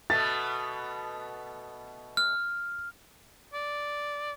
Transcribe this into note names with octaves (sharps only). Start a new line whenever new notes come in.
B2 A3 B3 A6
F6
D5